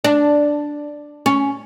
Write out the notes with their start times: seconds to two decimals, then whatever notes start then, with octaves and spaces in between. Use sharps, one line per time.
0.04 D4
1.26 C#4